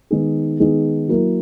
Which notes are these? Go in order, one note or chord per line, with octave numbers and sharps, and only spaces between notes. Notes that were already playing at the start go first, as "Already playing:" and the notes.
D#3 G#3 B3 D#4 G#4
D#3 G#3 B3 D#4 G#4
F#3 A#3 E4 A#4